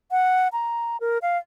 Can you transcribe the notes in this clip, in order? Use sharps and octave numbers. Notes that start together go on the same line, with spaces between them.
F#5
A#5
A#4
F5